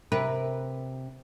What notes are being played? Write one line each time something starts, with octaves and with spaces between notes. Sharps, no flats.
C3 A#4 B4